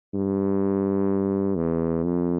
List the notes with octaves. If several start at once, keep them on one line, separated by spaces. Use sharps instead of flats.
G2
E2
F2